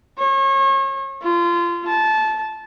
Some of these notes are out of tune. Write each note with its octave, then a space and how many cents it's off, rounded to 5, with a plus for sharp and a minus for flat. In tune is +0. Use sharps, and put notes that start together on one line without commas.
C#5 -35
F4 -25
A5 -20